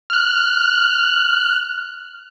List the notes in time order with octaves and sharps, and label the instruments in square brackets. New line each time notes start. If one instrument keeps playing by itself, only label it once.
[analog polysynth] F6 F#6